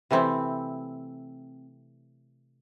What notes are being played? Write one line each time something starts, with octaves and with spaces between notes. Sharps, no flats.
C3 E3 A3 C4 E4